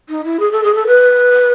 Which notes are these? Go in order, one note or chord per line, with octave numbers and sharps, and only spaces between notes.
D#4
E4
G#4
A4
G#4
A4
B4